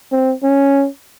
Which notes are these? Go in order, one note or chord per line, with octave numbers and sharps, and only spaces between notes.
C4
C#4